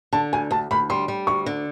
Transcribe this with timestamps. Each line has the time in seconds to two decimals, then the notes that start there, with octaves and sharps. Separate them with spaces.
0.13 D3 A5
0.33 D2 G#5
0.51 D2 A5
0.71 D2 B5
0.90 G3 C6
1.08 G3
1.27 D2 C#6
1.46 D3